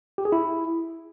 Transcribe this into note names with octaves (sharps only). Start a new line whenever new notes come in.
G4
G#4
E4